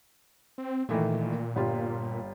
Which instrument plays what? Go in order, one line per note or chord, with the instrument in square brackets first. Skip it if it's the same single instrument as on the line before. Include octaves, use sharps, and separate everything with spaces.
[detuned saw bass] C4
[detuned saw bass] A#2 [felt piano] D#3 E3 A3
[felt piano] G1 G3 F4